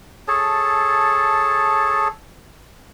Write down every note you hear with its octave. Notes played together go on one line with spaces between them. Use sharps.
G#4 A4 C#5 A5